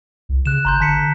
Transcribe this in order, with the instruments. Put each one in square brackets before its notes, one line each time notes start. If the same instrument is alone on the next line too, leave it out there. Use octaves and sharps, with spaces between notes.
[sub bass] C2
[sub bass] C#3 [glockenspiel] F#6 E7
[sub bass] G#1 [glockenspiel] A#5 C6 G6
[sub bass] D3 [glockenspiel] A5 B6 C#7